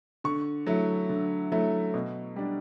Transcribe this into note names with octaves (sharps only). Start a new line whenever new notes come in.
D3 C#6
F#3 A3 E4
D3
F#3 A3 E4
B2
G3 D4